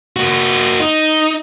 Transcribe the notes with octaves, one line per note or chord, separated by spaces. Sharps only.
A#3 F#4
D#4